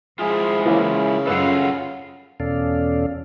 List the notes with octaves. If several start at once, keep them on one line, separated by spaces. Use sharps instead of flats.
F3 G#3 E4 F4 G#4
C#3 E3 A#3
F#2 F4 A4 B4 F5 F#5 E6
E2 B2 C#4 A4 D5 F5